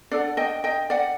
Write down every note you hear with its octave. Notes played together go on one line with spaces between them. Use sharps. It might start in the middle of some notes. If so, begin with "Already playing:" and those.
D4 A4 D5 F#5
D#5 G5
D#5 G5
D5 F#5